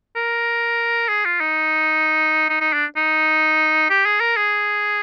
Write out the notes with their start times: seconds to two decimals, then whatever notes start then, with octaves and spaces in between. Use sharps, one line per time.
0.16 A#4
1.09 G#4
1.25 F4
1.41 D#4
2.50 D#4
2.61 D#4
2.73 D4
2.97 D#4
3.90 G4
4.06 G#4
4.20 A#4
4.37 G#4